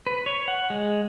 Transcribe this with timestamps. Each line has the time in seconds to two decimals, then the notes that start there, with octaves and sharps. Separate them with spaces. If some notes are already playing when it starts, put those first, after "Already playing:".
0.07 B4
0.26 C#5
0.48 F#5
0.70 G#3